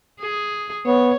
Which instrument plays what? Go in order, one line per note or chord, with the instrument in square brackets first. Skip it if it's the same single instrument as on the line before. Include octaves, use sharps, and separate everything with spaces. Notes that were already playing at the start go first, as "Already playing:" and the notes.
[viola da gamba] G#4
[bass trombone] B3 [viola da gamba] C#5